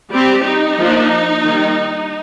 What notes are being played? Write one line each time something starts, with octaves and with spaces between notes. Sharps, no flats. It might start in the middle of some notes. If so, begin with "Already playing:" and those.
G3 C4 G4
D#4
F3 A#3 D4
D#3 G3 A#3